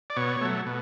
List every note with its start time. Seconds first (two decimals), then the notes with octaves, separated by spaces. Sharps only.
0.10 D5
0.16 B2 C#5
0.41 F#3 A3
0.66 B2